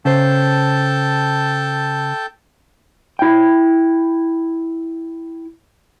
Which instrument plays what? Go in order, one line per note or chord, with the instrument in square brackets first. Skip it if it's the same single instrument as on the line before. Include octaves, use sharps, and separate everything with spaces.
[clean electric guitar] C#3 C5 [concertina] A4 G5 A5
[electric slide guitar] E4 G5